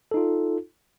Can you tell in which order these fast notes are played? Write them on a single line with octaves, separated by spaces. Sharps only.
A4 D#4 F4